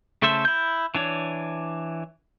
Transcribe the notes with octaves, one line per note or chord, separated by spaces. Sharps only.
C#3 A3 A4 C5 E5
E4 G6
E3 D4 C#5